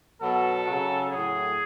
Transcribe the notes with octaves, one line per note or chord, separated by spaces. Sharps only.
B2 F#3 A4
C#3 F#3
A2 F#3 G#4